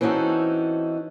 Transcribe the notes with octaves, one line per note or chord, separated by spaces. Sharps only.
E3 C4 C#4 D#4 F#4 A4